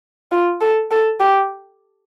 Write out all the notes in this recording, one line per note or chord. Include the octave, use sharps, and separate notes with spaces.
F4
A4
A4
G4